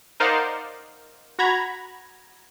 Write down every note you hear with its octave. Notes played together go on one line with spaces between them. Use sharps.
D#4 A#4 C5 D5 F5 F#5
F#4 A#5 B5 G#6